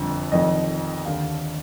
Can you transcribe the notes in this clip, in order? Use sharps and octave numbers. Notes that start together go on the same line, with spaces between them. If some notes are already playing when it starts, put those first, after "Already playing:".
Already playing: G1 F2 D3
F1 F2 D#3 D#5
D#2 D3 F5